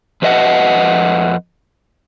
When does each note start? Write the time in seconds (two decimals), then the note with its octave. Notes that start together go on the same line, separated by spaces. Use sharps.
0.22 F2 F3 B4 D#5 E5 F#5